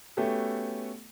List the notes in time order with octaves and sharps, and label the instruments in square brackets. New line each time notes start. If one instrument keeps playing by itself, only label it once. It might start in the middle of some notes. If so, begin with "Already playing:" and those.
[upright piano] A3 B3 C#4 F#4 G4 A4